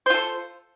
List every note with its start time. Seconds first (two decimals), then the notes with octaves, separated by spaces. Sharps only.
0.06 C5
0.10 F4
0.14 A4